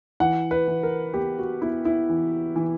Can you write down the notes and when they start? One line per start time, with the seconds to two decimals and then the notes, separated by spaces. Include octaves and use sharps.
0.20 E3 F#5
0.51 B4
0.68 E3
0.83 A#4
1.14 B3 G4
1.39 F#4
1.61 B3 E4
1.85 E4
2.09 E3
2.56 E3